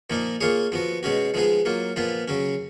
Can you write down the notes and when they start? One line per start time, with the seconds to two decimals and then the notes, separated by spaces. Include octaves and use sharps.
0.10 A#2 F3 A#3 D#4
0.41 A#3 F4 G#4 C#5
0.72 F3 B3 F#4
1.03 B2 G#3 C#4 F#4
1.34 F3 G#3 B3 D#4 G#4
1.65 F#3 A#3 F4
1.96 A#2 F3 B3 F4 B4
2.28 C#3 F#3 C#4